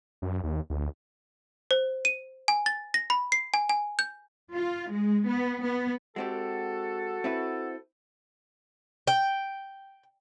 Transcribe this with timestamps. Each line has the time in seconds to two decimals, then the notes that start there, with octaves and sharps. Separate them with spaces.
0.22 F#2
0.43 D#2
0.70 D2
1.71 C5
2.05 D#7
2.48 G#5
2.66 A6
2.94 A#6
3.10 B5
3.32 C7
3.54 G#5
3.69 G#5
3.99 G6
4.55 F4
4.90 G#3
5.28 B3
5.63 B3
6.16 G#3 C4 F#4 G4 A4
7.24 C4 E4 B4
9.07 G5